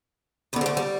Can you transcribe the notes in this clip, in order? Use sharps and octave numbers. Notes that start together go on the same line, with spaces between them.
D2 D3 B3
G3
A3
G3